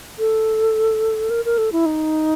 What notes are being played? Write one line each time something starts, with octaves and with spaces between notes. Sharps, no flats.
A4
A#4
A#4
A4
E4
D#4